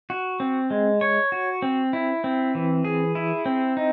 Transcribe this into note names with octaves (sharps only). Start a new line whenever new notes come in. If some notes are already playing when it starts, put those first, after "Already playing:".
F#4
C4
G#3
C#5
F#4
C4
E4
C4
E3
G#4
E4
C4
D#4